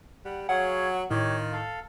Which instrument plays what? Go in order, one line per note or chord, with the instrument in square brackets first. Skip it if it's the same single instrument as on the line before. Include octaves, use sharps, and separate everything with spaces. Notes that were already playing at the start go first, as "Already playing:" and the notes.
[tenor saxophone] G3 [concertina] F#5
[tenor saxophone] F#3 [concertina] G#4 C#5 F5 [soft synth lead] F#5
[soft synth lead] A2 [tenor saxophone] D#3 [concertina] G4 C#5
[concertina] F4
A4 F5